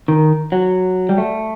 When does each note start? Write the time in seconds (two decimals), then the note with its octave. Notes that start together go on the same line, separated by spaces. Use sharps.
0.08 D#3
0.52 F#3
1.09 G3
1.18 A3